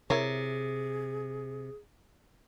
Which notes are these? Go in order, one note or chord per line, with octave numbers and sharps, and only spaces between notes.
C3 E4 G#4 A#4 C#5